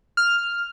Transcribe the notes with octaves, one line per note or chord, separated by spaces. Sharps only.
F6